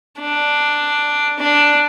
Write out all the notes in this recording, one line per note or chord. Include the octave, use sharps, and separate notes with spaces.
D4
D4